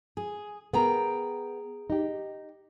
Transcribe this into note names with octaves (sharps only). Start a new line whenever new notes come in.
G#4
B3 G#4 A#4 G5 A#5
D#4 G4